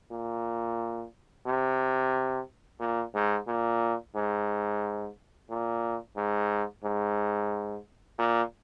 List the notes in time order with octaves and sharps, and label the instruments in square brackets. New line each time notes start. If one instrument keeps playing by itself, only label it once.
[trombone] A#2
C3
A#2
G#2
A#2
G#2
A#2
G#2
G#2
A#2